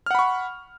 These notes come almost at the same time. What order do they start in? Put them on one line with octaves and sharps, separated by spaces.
F6 F#5 B5 C#6